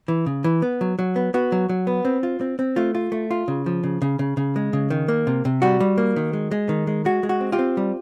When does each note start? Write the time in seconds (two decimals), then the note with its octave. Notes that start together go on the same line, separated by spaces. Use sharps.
0.08 E3
0.26 C#3
0.44 E3
0.62 B3
0.81 F#3
0.99 F#3
1.16 B3
1.34 B3 F#4
1.52 F#3
1.69 F#3
1.87 B3
2.05 C4
2.23 F4
2.41 C4
2.59 C4
2.76 A3 F4
2.95 F4
3.12 A3
3.31 F4
3.48 C#3
3.66 F3
3.84 C#3
4.02 C#3
4.19 C#3
4.37 C#3
4.56 G#3
4.73 C#3
4.90 D#3
5.08 A#3
5.27 C3
5.45 C3
5.62 G3 F#4
5.80 G3
5.98 A#3
6.16 D#3
6.33 G#3
6.51 G#3
6.69 D#3
6.87 G#3
7.05 G#3 F#4
7.23 G#3
7.29 F#4
7.41 C4
7.52 F4 G4
7.59 C4
7.77 G3